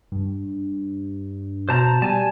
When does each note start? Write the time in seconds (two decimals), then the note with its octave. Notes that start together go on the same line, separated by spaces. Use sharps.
0.12 G2
1.69 B2 C5 A5 A#5
2.02 G3 G#5 A5